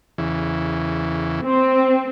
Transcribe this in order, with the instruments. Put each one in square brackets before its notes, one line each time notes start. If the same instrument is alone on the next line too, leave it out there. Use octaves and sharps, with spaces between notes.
[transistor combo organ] E2 C#3 E3
[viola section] C4